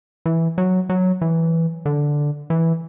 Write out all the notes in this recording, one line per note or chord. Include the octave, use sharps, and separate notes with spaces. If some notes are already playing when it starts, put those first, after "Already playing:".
E3
F#3
F#3
E3
D3
E3